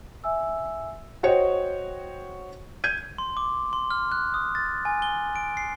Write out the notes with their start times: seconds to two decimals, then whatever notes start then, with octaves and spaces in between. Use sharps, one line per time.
0.24 E5 G#5 E6
1.23 F#4 C5 C#5 D#5 F#5 G5
2.84 G6 G#6 D#7
3.18 C6
3.37 D6
3.73 C6
3.91 F6
4.12 F#6
4.34 D#6
4.55 A6
4.85 G#5
5.02 G7
5.36 D7
5.57 C7